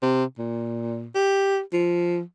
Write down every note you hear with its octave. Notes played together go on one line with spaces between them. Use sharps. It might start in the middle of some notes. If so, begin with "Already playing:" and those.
C3
A#2
G4
F3